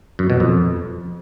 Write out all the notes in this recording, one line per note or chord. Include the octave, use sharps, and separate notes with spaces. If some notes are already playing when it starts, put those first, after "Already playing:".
F#2
B2
F2